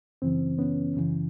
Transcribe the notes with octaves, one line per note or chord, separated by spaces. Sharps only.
F#2 C#3 E3 C4
B3 C#4
F#2 C#3 E3